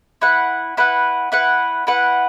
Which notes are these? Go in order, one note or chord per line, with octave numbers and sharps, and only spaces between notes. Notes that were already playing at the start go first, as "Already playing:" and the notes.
E4 B4 F#5
E4 B4 F#5
E4 B4 F#5
E4 B4 F#5